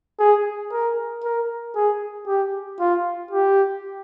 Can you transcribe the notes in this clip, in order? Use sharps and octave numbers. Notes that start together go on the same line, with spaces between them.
G#4
A#4
A#4
G#4
G4
F4
G4